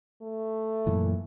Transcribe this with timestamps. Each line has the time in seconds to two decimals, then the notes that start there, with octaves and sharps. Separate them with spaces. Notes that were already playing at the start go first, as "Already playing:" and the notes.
0.22 A3
0.87 F#2 A#2 E3